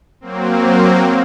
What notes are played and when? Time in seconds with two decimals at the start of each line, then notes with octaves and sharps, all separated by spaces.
0.21 F#3 A#3 C4